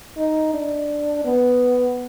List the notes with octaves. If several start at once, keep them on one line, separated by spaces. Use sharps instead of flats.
D#4
D4
B3